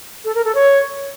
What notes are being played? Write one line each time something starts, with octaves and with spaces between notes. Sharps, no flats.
A4
A#4
A4
C#5